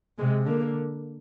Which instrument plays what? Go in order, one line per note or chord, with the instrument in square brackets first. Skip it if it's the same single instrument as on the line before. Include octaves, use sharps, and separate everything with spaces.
[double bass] C3 [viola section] G#3
[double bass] D3 [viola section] A#3